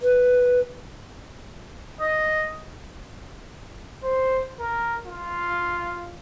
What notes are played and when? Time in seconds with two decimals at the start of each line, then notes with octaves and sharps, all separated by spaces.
0.02 B4
2.00 D#5
4.03 C5
4.59 A#4
5.06 F4